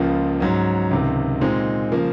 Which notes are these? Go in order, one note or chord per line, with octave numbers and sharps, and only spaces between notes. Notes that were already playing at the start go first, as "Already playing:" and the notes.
Already playing: C#2 C#3 F3 A#3
G#2 F#3 C#4
C#2 C3 D#3
A#2 G#3 C4 D#4
C#3 F3 A#3